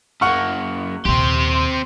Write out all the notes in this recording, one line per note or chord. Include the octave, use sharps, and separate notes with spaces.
F#2 A#3 F#5 C#6 F6
D#2 A#2 C4 G4 C6